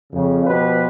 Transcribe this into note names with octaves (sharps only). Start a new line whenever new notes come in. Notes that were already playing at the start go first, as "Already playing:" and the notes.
F2 C#3
B2 F3 G4 B4 C5